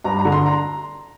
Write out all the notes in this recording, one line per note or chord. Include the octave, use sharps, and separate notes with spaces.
G2 A#5
A#5
D3
C6
A#5